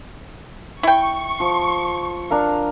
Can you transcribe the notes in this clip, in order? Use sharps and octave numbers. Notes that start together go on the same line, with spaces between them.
E4 G5 C#6
F3
D4 A#4 F5